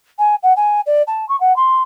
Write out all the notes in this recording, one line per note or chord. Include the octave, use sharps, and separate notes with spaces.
G#5
F#5
G#5
D5
A5
C#6
F#5
C6